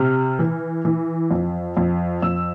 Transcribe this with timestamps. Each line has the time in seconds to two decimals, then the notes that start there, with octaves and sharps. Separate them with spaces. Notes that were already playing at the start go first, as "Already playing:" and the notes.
Already playing: C3 F6
0.39 E3
0.85 E3
1.31 F2
1.77 F2
2.22 F2 E6